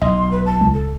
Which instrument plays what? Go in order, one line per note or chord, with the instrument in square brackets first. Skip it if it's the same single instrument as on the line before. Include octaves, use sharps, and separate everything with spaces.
[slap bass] B1 [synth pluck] D#5 [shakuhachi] C6
[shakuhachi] B4
A5
[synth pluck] C#2
[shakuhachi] A4